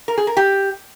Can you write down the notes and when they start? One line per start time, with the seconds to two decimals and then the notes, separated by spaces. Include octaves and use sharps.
0.08 A#4
0.18 G#4
0.27 A#4
0.37 G4